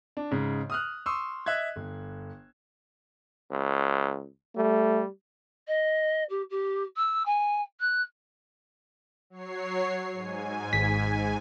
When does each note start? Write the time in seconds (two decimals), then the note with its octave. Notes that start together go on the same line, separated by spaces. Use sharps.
0.17 D4
0.31 G#2 C#3
0.70 D#6 F6 F#6
1.06 C6 C#6 D#6 E6
1.46 D#5 E5 F#6 G#6
1.76 G1
3.51 C#2
4.56 G3 A3
5.68 D#5
6.29 G4
6.50 G4
6.96 E6
7.26 G#5
7.80 F#6
9.30 F#3 C#5 C7
10.13 G#2 G#5
10.73 G#1 B6